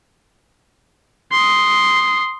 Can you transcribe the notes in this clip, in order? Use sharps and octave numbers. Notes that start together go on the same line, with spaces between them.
C6 D#6